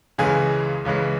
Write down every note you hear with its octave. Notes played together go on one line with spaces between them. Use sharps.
C#2 C#3 E3 G#3 G#4 G#5
C#2 C#3 E3 G#3